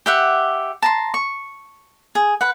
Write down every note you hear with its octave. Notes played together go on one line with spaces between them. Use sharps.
G4 E5 F#5
A5 A#5 C6
C#6
G#4
B4 F#5